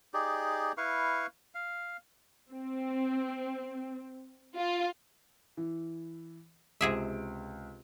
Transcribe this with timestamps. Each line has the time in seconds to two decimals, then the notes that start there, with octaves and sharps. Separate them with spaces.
0.14 D#4 G4 G#4 D5
0.77 E4 B4 F5 C#6
1.55 F5
2.50 C4
4.54 F4
5.57 E3
6.81 C#2 C3 G#4 E5 D7